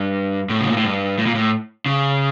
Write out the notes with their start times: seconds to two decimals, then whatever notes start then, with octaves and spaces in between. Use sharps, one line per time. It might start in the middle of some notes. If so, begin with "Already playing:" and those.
Already playing: G2
0.49 A2
0.61 C#3
0.69 A#2
0.77 A2
0.84 G2
1.18 A2
1.26 A#2
1.35 A2
1.86 C#3